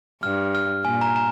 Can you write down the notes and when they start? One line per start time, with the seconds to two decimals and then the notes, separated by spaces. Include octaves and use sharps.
0.23 G2 F6
0.55 F6
0.85 A#2 G#5
1.01 A#5
1.16 A#5